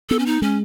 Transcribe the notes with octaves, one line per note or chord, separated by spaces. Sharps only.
B3 A4
C#4
D#4
G#3 C#4